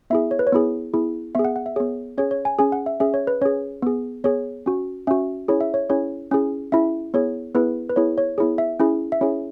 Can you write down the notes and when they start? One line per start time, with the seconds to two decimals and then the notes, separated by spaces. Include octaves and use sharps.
0.10 B3 E4 G#4 E5
0.31 C#5
0.39 B4
0.47 C#5
0.52 B3 E4 G#4
0.94 B3 E4 G#4
1.35 B3 G#4 E5
1.45 F#5
1.56 F#5
1.66 E5
1.76 B3 G#4 C#5
2.18 C#4 G#4 C#5
2.31 C#5
2.45 G#5
2.59 C#4 G#4 G#5
2.72 F#5
2.86 E5
3.00 C#4 G#4 E5
3.14 C#5
3.27 B4
3.42 C#4 G#4 C#5
3.82 B3 G#4
4.24 B3 G#4 C#5
4.66 C#4 F#4
5.07 C#4 F#4 E5
5.48 C#4 E4 G#4 C#5
5.61 E5
5.74 C#5
5.89 C#4 E4 G#4 C#5
6.31 C#4 E4 G#4
6.72 C#4 E4 G#4 E5
7.14 B3 E4 G#4 C#5
7.55 B3 E4 G#4 B4
7.89 B4
7.96 B3 E4 G#4 C#5
8.18 C#5
8.38 B3 E4 G#4 C#5
8.58 E5
8.80 C#4 E4 G#4
9.12 E5
9.21 C#4 E4 G#4 C#5